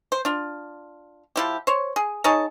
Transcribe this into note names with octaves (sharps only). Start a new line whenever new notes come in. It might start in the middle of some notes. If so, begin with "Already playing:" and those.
C5
D4 F4
F3 E4 G4
C5 C#5
G#4
D#4 G#4 C#5 A5